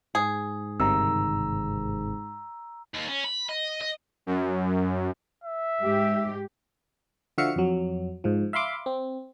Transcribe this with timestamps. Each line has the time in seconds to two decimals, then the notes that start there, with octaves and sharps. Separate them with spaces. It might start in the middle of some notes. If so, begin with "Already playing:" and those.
0.15 G#2 G#4
0.80 G1 C3 D#3 A#5 E6
2.95 D#2
3.09 C#4
3.25 B5
3.49 D#5
3.81 D#5
4.26 F#2
5.44 E5
5.81 G#2 G4
7.38 D3 F3 F#4 E5 F5 C#7
7.56 F2 F#3
8.24 G#2 F3
8.53 E5 F5 B5 C6 D6
8.86 C4